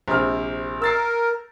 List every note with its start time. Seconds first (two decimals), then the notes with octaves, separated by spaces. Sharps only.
0.08 A#1 C3 F6
0.82 A#4 E6 A6 C7